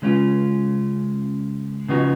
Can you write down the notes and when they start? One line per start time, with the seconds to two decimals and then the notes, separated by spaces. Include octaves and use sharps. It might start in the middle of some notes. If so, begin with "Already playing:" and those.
0.02 C#3 G#3 C#4 F4
1.88 C#3 F3 B3 D#4 F#4